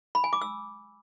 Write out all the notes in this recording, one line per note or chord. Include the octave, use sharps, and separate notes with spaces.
B5
G#5
D6
E6